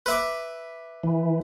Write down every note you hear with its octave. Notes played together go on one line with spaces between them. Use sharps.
B4 E5 D6
E3